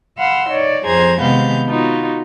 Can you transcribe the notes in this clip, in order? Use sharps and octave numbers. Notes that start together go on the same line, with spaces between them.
F5 F#5 B5 C6 E6
D#4 C#5 D5
F2 G#4 C5 A#5 G#6
C3 D#3 G#3 B3 F5 G6
B3 D#4 F4 F#4